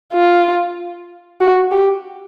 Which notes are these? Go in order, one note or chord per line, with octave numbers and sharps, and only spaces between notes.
F4
F#4
G4